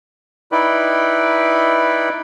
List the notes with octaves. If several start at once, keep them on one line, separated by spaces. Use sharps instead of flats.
D#4 E4 B4 D5 G5 B5